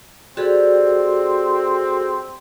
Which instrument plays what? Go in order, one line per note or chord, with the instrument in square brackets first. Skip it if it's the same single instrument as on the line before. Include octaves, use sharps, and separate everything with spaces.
[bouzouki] G3 [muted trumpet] C4 [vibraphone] F#4 G#4 A4